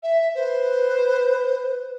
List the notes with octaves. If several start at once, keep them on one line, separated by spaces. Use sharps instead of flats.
E5
B4 C5